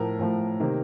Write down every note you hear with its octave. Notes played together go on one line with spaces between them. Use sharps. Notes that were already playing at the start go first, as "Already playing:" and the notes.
Already playing: A2 F3 A3 A#4
A2 F3 A3
C3 D#3 A#3